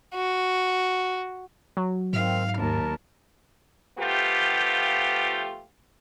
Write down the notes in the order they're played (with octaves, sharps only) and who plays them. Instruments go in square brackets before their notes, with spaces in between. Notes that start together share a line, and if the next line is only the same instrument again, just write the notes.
[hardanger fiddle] F#4
[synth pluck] F#3
[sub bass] G#2 [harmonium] D#3 C4 [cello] F5
[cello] D#2 [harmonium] A#4 A5
[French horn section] F3 A3 B3 F4 G4